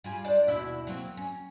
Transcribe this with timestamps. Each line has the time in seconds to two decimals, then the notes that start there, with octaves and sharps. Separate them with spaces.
0.04 G3 F4 G#4
0.24 D4 C5 D5
0.48 D#2 B2 E4
0.87 F#3 A#3 C4
1.17 C#4